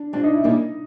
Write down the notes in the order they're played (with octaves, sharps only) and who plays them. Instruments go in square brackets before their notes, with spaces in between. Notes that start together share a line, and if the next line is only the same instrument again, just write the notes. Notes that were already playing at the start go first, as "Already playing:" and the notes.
Already playing: [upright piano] D4
[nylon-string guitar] G3 C4 F4 [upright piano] D4
[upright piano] D#4
E4
[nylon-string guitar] B2 G3 A#3 C#4 [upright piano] D#4